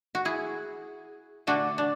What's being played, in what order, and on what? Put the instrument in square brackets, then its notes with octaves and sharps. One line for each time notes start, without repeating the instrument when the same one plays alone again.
[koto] F#4
E4 G#4
D3 A3 D4 F#4
D4